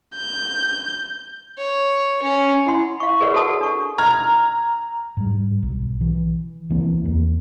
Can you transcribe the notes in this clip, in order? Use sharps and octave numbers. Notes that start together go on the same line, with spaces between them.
G6
C#5
C#4
E4 F#5 C6
F5 C#6
G#4 A#4 B4 C#5 D5 F#5
F#4 A4 F#5 A5 D#6
D4 C#6
A#5 F6 G#6
G#2 G3
B1
E3
C#2 E3 A#3 C4
E2 A#3